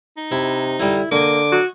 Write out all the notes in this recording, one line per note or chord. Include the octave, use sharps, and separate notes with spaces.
D#4
C3 E4
D3 G3 E4
D3 A#3 D#5 G#5 D6
F#4